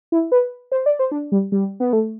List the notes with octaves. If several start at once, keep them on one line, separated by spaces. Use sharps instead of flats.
E4
B4
C5
D5
C5
D4
G3
G3
B3
A3